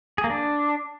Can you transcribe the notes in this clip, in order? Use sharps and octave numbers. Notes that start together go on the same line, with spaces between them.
G#4
A#3
D4